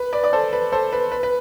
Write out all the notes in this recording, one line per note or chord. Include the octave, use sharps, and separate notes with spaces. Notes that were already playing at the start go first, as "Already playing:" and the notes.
Already playing: B4
B4 D5
D5
A4 C5
B4
A4 C5
B4
B4
B4